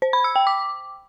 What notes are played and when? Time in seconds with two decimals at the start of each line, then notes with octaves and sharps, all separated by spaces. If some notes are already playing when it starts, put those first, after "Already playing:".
0.02 C5
0.13 B5
0.24 E6
0.36 G5
0.47 D6